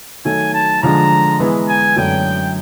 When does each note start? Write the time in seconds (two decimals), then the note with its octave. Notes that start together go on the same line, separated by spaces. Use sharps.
0.25 D#3 F#3 A3 G#5
0.54 A5
0.82 D3 F3 G#3 A#5
1.40 E3 G#3 B3
1.68 G#5
1.96 F#2 D3 F#3 A3 D4 G5